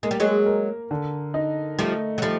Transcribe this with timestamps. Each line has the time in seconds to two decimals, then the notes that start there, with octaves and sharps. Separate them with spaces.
0.03 G#3 A#3
0.11 G3
0.20 F#3 G#3
0.46 A#4
0.91 D3
1.34 D#4
1.79 F3 G3 A3
2.18 F#3
2.22 F3 G3 A3